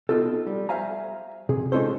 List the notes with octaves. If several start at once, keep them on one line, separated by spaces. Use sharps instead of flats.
B3 D#4 F4 G4 A4
G3
C5 E5 F5 G#5 A#5
C3 G#4
G#3 C#4 D#4 F4 A4 C5